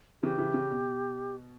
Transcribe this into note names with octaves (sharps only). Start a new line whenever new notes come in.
C#3 E3 G4
C#3 E3
C#3
B2